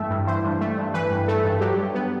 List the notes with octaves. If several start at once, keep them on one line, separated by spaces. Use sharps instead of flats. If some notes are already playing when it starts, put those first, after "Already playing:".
Already playing: G2 E3 A3 E5 G5
G2
E3 C5
G2
A3
G2
E3 B4
G2
A3 A4
G2
F#3 G4
G2
B3